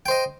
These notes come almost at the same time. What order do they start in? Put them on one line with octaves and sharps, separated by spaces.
G5 C5 D#5